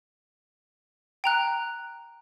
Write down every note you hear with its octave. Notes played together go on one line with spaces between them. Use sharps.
G5 A#5 F#6